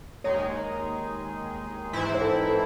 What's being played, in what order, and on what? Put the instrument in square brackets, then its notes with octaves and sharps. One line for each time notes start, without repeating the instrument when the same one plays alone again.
[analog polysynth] D#2 D#3 G#3 D#4 G#4 [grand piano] C#5
[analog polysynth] G#2 E3 C4 E4
[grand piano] C5
A4
A4